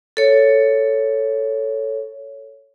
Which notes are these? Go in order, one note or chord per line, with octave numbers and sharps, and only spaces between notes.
A4 C#5